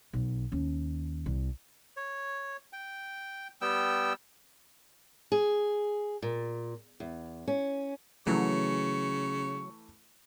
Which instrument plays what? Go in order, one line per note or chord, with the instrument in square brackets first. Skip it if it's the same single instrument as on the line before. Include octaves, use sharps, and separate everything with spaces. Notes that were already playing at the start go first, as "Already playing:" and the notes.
[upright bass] B1
D#2 C#4
C2
[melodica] C#5
G5
G3 B3 G5 E6
[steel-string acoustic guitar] G#4
A#2
E2
C#4
[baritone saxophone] C#3 [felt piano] E3 A3 [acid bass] F#3 [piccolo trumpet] C#6